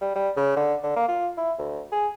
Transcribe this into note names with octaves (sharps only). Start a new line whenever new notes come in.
G3
G3
C#3
D3
D3
A#3
F4
E4
D2
G#4